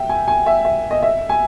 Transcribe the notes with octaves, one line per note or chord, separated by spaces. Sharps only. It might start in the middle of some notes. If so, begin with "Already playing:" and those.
Already playing: E5 G5
G#5
G#5
E5
E5
D#5
E5
G#5